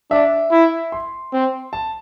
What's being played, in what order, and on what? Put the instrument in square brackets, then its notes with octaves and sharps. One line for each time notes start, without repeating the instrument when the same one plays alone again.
[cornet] D4 [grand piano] E5
[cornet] E4
[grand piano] C6
[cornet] C4
[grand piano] A5